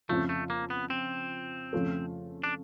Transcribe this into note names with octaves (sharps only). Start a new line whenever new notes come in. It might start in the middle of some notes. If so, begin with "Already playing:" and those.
F2 C#3 F3 A3
A3
A#3
B3
C4
F2 C#3 F3 A3
D4